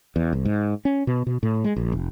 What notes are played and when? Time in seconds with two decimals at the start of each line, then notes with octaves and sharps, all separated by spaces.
0.16 E2
0.33 C2
0.45 G#2
0.85 C#4
1.07 B2
1.27 B2
1.43 A2
1.64 G#3
1.76 A#1
1.92 F1